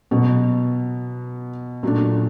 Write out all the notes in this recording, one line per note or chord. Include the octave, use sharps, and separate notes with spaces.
B2 F#3 B3
A#2 F#3 A3 D4